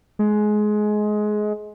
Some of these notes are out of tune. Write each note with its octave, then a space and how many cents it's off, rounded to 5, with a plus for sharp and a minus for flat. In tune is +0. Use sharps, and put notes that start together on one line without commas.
G#3 +20